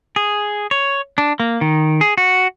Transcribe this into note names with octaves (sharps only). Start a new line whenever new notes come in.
G#4
C#5
D4
A#3
D#3
G#4
F#4